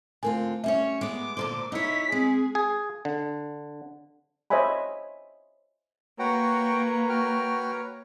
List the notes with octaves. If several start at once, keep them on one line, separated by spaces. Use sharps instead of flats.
D3 A3 C4 F4 A#4 G#5
G3 C#4 C#5 E5
G#3 B3 D6
A#2 D3 C5
D#4 E4 C#5 B6
G#3 C4 G#4
G#4
D3
C5 C#5 D#5 E5 G#5 B5
A#3 F#4 B4 C#5 F#5 G5 A#5
F#4 G5 F6